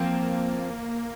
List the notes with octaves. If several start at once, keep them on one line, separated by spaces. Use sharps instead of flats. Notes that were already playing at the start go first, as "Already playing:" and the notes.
Already playing: F3 A#3 C4 F4